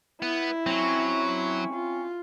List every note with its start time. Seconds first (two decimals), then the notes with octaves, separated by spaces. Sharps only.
0.22 B3 E4
0.66 F#3 C4 C#4
1.73 F4